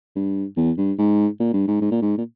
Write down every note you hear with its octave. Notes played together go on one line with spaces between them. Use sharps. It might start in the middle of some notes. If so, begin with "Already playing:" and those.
G2
E2
G2
G#2
A#2
G2
G#2
G#2
A#2
G#2
A#2